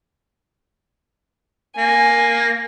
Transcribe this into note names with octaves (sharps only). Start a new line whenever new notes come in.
A#3 G#5